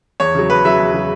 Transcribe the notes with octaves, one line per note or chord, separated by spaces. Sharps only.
E2 C#5
C#3 F#3
E2 B4
C#3 F#3 E5
E2
C#3 F#3